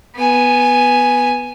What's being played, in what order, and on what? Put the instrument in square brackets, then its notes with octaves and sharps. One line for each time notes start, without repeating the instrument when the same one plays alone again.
[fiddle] B3 G#5